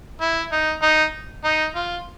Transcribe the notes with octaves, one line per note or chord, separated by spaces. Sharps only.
E4
D#4
D#4
D#4
F4